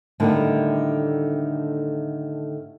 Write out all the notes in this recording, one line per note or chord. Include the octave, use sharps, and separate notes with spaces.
A2 D3 D#3 G3 A3 A#3